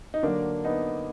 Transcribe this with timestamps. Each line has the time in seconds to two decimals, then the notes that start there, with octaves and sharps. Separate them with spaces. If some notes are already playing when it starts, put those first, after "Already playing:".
0.14 D#4
0.23 D3 F#3 A#3 D4
0.65 B3 D#4